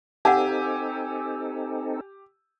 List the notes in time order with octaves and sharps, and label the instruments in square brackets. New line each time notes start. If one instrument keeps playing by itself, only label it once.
[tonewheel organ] C4 D#4 A4 [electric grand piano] G4 [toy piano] F5 F#5 [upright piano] G#5 E6